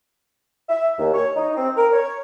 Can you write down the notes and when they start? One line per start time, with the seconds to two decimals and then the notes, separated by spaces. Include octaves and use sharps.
0.69 E5
0.99 D#2
1.14 C#5
1.36 D#4
1.56 C4
1.77 A#4
1.93 C#5